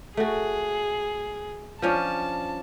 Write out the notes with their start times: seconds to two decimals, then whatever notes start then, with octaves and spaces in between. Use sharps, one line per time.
0.17 A3 F#4 G#4
1.82 F3 C#4 D4 A5